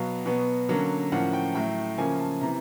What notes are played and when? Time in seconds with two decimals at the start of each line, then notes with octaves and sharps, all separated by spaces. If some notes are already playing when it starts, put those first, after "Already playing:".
Already playing: B2 F#3 B3 F5
0.26 B2 F#3 B3
0.69 D3 F#3 A#3 C#4
1.12 A2 F3 A#3 C#4 F#5
1.33 G5
1.55 A2 F#3 A3 G5
1.98 C#3 F3 A#3 C#4 G#5
2.20 A5
2.41 C3 E3 A#5